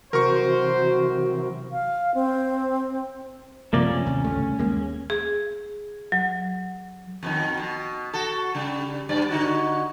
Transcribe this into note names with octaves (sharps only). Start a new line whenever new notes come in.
C3 E3 F#3 F#4 A#4 C5 C#6
F5
C4
F#2 C3 F3 A3 A#3 D5
C#4
A1 D#2 C3
C#2 G2 A3
D#2 G#3 A#3
G#4
F#3
F2 B2 D#3
B2
F#4 A4
C#3 G3
G2 D5
D3 D#4 F#4